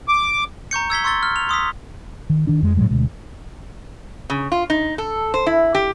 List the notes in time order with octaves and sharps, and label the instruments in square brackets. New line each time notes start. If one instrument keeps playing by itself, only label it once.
[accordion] D6
[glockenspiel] A#5 C#6 G6 C#7
E6 G#6 B6 G7
C6 C#6 E6 A6 G7
F6
F7
C6 D#6 E6 B6
[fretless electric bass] D#3
D#3 D4
F2 G#3
A2 C#3 F#3 G#3
D2 B2 G#3
[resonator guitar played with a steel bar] C#3
F4
D#4
A4
C5
E4
G4